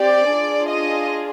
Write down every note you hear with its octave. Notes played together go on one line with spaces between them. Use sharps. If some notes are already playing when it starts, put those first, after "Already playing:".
Already playing: C4 G4 D5
D4 F4 G#4
D#5